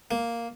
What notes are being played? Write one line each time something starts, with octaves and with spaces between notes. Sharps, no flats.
A#3